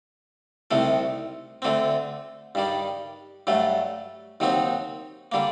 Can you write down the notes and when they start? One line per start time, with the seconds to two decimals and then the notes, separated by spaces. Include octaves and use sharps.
0.71 C2 C3 D#3 A3
1.62 D2 D3 A3 C4
2.55 G2 D#3 G3
3.47 G2 F#3 A3
4.40 D#2 D#3 F#3 C4 D#4
5.32 D3 G3 A#3